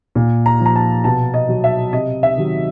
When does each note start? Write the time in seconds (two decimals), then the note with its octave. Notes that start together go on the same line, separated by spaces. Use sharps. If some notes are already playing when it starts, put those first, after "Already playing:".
0.15 A#2
0.46 A#5
0.60 F3
0.66 A#5
0.76 A5
1.04 B2 A5
1.34 D#5
1.49 F#3
1.64 E5
1.93 C3 D#5
2.23 E5
2.37 D#3 F#3